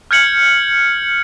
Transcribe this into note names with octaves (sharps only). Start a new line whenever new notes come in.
F6 G6 G#6 C#7 F#7